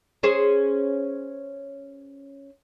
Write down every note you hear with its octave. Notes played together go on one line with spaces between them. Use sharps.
C#4 G#4 C5